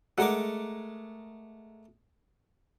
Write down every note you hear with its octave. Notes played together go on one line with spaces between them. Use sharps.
G#3 A3 A#4 F#5 D6